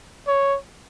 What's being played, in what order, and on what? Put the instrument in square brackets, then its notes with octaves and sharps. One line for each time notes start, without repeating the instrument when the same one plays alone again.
[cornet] C#5